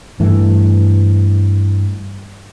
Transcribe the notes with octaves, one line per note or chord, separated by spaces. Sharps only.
G2 E3 A3